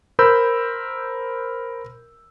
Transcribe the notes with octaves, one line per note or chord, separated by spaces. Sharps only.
A#4 C5 B5 E6 G6